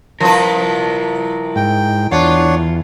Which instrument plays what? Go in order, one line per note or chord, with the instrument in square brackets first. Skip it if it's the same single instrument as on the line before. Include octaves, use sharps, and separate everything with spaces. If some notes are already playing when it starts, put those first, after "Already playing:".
[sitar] F3 B4 [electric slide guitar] E4 A#4
[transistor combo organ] G#2 [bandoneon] G5
[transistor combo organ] E2 [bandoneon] D4 C#5 F#5 [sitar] F4